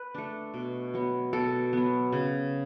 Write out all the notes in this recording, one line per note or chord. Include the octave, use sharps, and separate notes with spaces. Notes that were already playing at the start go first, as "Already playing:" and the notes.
Already playing: B4
A3 D4
B2
F#3 B3
B2 A4
F#3 B3
C#3